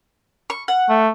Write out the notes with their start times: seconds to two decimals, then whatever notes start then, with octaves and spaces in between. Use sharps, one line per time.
0.50 C#6
0.68 F#5
0.89 A3